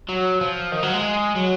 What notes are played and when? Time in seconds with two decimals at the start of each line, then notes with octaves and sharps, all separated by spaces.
0.09 F#3
0.41 F3
0.72 D#3
0.83 F#3
0.94 G#3
1.36 F#3